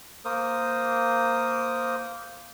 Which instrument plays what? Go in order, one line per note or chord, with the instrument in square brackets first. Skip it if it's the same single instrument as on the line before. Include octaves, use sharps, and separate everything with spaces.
[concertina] A#3 A#4 C5 D#6